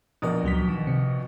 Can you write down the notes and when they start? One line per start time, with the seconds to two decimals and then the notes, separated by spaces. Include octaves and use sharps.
0.22 A#1 B2 A#4 D5 A#5 D#6
0.43 C#2 F#3 B6
0.68 D#3
0.87 C3